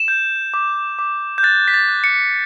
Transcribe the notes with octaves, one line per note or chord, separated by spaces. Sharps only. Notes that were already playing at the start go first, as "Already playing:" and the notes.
Already playing: E7
G6
D6
D6
G6
F#6 A6
B6
A6
F#6
C#7